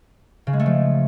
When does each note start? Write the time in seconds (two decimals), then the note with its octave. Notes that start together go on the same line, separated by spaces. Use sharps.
0.47 C#3
0.53 G#3
0.60 A3
0.66 F3